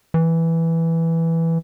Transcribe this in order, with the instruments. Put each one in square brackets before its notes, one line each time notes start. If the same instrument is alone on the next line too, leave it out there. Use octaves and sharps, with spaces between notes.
[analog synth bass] E3